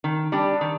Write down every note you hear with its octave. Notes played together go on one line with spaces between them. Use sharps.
D#3
G3 D4 G4
D#3